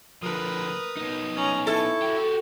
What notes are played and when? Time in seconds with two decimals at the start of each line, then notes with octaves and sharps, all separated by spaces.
0.23 D3 F3 A#4 B4 D#6
0.97 B3 D#4
1.35 C#4 A#5
1.67 E4 A4 C#6
2.02 F#4 G4